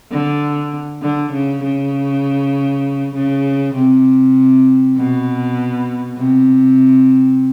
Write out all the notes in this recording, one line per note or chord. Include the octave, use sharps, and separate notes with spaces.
D3
D3
C#3
C#3
C#3
C3
B2
C3